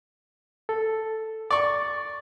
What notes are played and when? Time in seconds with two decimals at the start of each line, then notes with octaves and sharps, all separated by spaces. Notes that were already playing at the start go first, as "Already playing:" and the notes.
0.69 A4
1.51 D5 C#6 A6